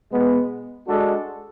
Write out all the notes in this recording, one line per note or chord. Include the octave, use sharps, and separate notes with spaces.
B2 G#3 B3
G#3 D4 F#4 A4